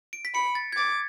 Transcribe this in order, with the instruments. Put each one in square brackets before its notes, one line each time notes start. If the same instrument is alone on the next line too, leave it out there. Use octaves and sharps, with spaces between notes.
[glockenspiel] D7
B6
[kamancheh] B5 [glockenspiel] C#7
[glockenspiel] A6
G#6
[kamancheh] D6 [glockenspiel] A6